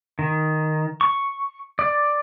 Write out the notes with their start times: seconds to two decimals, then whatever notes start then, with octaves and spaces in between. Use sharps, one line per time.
0.19 D#3
1.01 C#6
1.79 D5